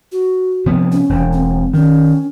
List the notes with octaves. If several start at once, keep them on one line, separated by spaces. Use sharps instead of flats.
F#4
C3 F3 B3
C#4
E1
C4
D#3 C#4